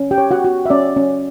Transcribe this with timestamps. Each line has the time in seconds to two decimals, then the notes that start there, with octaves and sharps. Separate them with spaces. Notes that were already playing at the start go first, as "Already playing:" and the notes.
Already playing: C#4
0.11 G4 G5
0.18 C#5
0.31 F#4 F#5
0.45 F#4
0.66 E5
0.70 C#4 D5
0.96 C#4